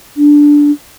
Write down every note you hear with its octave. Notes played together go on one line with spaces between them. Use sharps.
D4